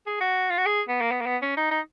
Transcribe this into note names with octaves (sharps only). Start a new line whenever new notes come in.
G#4
F#4
F4
F#4
G#4
B3
A#3
B3
A#3
B3
C#4
D#4
D#4